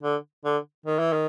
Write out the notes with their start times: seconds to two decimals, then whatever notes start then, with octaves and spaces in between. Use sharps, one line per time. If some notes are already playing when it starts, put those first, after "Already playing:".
0.03 D3
0.45 D3
0.86 D#3
0.99 E3
1.13 D#3